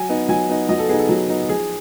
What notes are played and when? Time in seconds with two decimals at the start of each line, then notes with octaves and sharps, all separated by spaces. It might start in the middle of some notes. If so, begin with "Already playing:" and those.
Already playing: F#3 G#5
0.09 B3 D#4
0.28 F#3 G#5
0.49 B3 D#4
0.69 F#3 D#5
0.79 A4
0.89 B3 D#4 G#4
0.99 A4
1.09 F#3
1.29 B3 D#4
1.49 F3 G#4